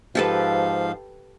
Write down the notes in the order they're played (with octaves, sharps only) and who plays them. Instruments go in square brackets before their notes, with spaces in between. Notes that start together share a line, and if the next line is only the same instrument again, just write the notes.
[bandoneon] G#2 F3 F5 [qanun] G4 A4 B4